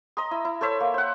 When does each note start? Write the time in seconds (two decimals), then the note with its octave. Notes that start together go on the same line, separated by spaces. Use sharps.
0.17 D#5 A#5 C6 D#6
0.31 E4
0.45 E4
0.61 A4 C5 C#5 E5
0.80 A#3
0.94 C5 F#5